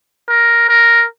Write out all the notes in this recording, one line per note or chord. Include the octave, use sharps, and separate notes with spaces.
A#4
A#4